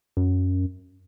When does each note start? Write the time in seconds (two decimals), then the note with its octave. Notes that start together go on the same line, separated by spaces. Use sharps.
0.17 F#2